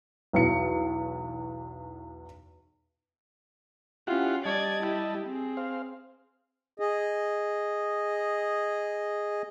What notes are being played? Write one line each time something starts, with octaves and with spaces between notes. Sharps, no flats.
B1 E2 C#7
C#4 E4 F4 G4 F#5
G3 D5 D#5 A5 G#6
E4 G4
C4 G#4
C5 F5
G#4 D#5